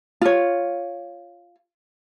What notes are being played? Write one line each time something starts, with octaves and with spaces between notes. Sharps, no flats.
F4 C#5